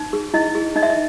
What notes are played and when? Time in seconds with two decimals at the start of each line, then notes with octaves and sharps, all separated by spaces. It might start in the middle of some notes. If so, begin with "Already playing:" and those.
Already playing: D#4
0.13 G#4
0.34 E4 D#5
0.55 G#4
0.76 D#4 D#5
0.83 E5
0.90 D#5